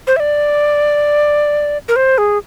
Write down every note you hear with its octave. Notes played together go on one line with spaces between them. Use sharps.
C5
E5
D5
A#4
C5
G#4